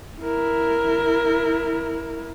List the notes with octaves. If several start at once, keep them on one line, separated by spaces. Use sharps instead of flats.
E4 A#4